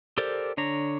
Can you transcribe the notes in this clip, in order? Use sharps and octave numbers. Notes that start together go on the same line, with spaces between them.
G4 A4 A#4 C5 D5
D3 D4 C#5 A#5